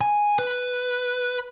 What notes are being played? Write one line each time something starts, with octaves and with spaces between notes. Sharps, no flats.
G#5
B4